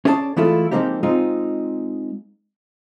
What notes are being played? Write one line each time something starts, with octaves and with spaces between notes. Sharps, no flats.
C#4 G#4 C#5 D5 F#5 A5
E3 G#3 A3 E4 F4 A4
F3 G#3 A#3 C4 D#4 G4
G#3 C4 D#4 F4